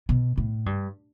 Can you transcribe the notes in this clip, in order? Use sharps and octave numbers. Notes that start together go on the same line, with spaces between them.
B2
A2
G2